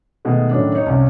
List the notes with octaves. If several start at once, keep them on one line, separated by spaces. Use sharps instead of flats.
B2 D#3 G#3 A3
A2 D#3 F#3 C#4 D4
D#4 C#5
C2 C3 C#4